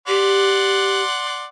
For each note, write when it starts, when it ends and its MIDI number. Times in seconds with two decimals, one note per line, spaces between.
0.08 1.02 67
0.08 1.45 74
0.08 1.45 78
0.08 1.45 84